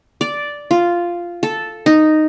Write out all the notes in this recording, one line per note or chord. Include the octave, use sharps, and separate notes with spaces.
D5
F4
A4
D#4